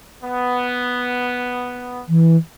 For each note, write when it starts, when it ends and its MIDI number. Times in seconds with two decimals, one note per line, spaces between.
0.24 2.03 59
2.09 2.37 52